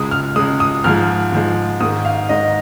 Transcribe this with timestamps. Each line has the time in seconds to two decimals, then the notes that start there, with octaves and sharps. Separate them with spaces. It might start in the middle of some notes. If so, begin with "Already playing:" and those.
Already playing: C#2 C#3 G#3 D#6
0.11 F6
0.36 C#2 C#3 G#3 D#6
0.60 D#6
0.84 G#2 F3 G#3 F6
1.32 G#2 F3 G#3
1.80 G#2 D#3 G#3 D#6
2.05 F5
2.29 G#2 D#3 G#3 D#5